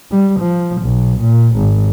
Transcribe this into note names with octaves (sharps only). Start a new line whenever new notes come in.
G3
F3
B1
A#2
G#1